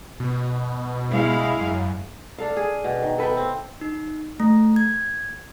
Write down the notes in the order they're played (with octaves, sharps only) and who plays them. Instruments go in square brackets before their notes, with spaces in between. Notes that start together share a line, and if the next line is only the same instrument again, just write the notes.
[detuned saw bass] B2
[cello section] G#3 E4 F5
[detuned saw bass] F#2
[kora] D4 A4 F5
G#4
B2
D#3
A4 B4 E5 G5
C4
[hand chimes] D#4
A3
G#6